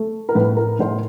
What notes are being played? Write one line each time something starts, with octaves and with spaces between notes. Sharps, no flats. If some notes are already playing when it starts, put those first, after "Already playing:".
Already playing: A3
A#4
A2 B4
A#4
A2 C5